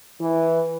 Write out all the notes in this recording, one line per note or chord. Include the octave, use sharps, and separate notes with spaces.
E3